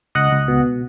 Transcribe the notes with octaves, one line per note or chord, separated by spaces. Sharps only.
C#2 D#5 F#5
C#2
B2